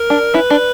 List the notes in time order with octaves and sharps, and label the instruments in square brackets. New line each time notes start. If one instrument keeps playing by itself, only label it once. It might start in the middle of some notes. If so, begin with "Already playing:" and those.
Already playing: [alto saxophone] A#4
[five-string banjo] D4
[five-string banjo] C#4 E4 [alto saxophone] B4
[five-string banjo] D4